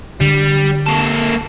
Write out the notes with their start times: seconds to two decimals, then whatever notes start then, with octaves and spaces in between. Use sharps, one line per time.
0.21 D3 G3
0.86 A#3 A4